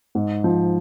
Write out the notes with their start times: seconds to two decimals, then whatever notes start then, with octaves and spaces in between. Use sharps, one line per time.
0.15 G#2
0.44 F3